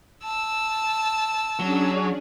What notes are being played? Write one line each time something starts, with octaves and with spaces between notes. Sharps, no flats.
A5 E6
F#3 C#4 D4 G#4